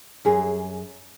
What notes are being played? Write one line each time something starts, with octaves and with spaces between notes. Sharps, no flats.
F#2 G#4